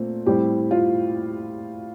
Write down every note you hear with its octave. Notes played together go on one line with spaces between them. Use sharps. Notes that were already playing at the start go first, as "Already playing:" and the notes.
Already playing: A#2 A3 C4
A2 G3 C4 G4
F4